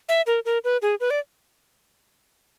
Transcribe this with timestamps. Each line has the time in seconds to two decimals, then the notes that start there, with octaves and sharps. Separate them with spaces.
0.09 E5
0.27 A#4
0.45 A#4
0.64 B4
0.82 G#4
1.00 B4
1.10 D5